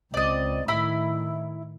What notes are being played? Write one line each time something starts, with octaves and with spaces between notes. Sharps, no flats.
C#2 C4 D5 D#5
A2 D#3 E4 B5